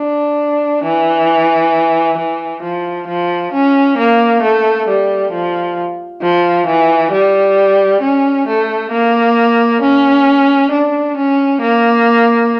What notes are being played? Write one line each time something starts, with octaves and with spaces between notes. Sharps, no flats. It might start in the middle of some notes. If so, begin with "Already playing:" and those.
Already playing: D4
E3
E3
F3
F3
C#4
A#3
A3
G3
F3
F3
E3
G3
C#4
A3
A#3
C#4
D4
C#4
A#3